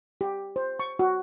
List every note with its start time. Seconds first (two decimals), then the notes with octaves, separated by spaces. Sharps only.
0.21 G4
0.56 C5
0.79 C#6
0.99 F#4